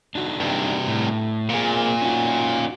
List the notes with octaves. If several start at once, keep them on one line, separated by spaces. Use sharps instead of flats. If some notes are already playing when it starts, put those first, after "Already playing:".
D4 D#4 F#4
G2 C3
A2
A#2 A#3 C4 G#4
C#4 D#4 F#4